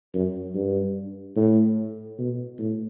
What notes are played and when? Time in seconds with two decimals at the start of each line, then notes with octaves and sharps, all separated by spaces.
0.14 F#2
0.55 G2
1.36 A2
2.18 B2
2.59 A2